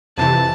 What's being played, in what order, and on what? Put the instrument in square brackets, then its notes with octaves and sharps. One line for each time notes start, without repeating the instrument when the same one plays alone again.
[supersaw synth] F2 C3 E3 [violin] A5